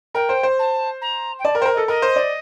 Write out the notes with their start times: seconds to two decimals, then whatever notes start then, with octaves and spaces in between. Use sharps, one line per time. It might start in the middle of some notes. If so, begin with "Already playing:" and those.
0.14 A#4 G5
0.29 C5
0.43 C5
0.59 A5
1.01 A#5
1.39 G5
1.44 D5 A5
1.55 A#4
1.59 C5 G5
1.65 A#4
1.73 A4 D#5
1.87 A#4 D#5
2.02 C5
2.16 D5